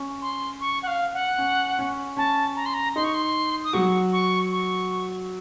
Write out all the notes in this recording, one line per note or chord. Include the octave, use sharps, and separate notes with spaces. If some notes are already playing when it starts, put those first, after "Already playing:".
Already playing: C#4
C6
C#6
F#5
F5
F#5
C#4
C#4
C#4 A5
A#5
C6
A#5
D#4 C6
C#6
C6
D#6
F#3 F#4 C#6
C#6
C#6